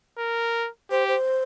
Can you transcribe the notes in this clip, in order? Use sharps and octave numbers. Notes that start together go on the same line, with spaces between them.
A#4
G4 C5
C5